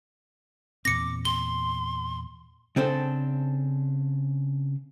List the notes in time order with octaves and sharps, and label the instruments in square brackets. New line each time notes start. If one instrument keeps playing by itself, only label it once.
[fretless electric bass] E2 A#2 C4 [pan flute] D6 [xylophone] A#6 C#7
[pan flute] C6 [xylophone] G7
[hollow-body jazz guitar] C#3 C4 D4 A4 C5